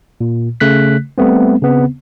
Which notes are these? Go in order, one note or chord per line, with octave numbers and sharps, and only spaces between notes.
A#2
C#3 A3 F#6 B6
G3 A3 B3 C4
C#3 B3 C4